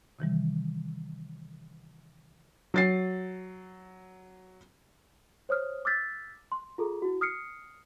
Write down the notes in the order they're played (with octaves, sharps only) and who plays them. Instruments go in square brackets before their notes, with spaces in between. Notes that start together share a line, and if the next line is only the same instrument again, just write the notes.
[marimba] C3 D#3 E3 G3
[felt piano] F#3 A6 C7
[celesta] C5 C#5 D#6 F6
D6 E6 F6 G6 A6 B6
C6
F4 G#4 A4 A#5
E4 F#4
D#6 F6 C7 C#7